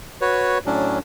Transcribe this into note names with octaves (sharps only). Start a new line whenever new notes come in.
F#4 B4 C#5
A2 F#3 C#4 D4